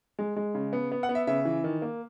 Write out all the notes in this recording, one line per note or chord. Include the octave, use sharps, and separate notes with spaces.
G#3
G#3
C#3
B3
B3
F#5
B3
E5
C#3 E5
E3
D#3
A#3